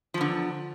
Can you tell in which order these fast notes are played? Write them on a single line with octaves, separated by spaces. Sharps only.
F3 E2 D3